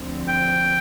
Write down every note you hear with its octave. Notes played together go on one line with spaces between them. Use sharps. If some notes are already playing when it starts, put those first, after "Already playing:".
Already playing: D2 D3 F3 C4
G5